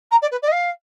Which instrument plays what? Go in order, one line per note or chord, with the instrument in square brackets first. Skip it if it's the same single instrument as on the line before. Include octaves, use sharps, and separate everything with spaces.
[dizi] A#5
D5
B4
D5
D#5
F5